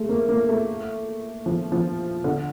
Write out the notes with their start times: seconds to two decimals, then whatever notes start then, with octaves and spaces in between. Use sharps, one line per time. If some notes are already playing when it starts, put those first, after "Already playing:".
Already playing: G#3 A3
0.09 A#3
0.29 A#3
0.49 A3
1.46 F3
1.72 F3
2.24 D3